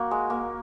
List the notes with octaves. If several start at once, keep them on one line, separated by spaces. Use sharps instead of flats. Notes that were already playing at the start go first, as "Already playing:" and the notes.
Already playing: A#3 F#4
G#3
A#3